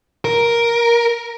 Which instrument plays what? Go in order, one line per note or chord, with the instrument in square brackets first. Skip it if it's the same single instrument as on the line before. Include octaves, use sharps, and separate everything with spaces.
[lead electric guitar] A#4